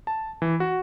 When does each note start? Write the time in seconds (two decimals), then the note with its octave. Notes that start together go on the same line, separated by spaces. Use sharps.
0.07 A5
0.42 E3
0.60 F#4